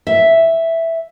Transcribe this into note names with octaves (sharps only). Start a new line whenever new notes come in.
E5